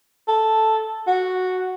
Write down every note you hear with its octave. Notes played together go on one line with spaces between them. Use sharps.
A4
F#4